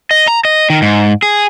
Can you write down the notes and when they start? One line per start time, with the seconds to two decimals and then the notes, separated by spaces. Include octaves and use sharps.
0.11 D#5
0.28 A#5
0.45 D#5
0.70 D#3
0.82 G#2
1.22 G#4